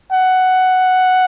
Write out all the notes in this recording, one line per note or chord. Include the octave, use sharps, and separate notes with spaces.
F#5